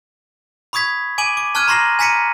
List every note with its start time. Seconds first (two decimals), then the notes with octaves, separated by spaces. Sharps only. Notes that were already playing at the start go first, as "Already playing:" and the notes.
0.73 B5 C#6 D#6 G#6 B6
1.18 G#5 D6 D#7 F#7
1.37 D6
1.55 A5 C#6 F6 F#6 G#6 D#7
1.68 A#5 C6 C#6 A#6 C7 F#7
1.99 G#5 A#5 B6 C#7 D#7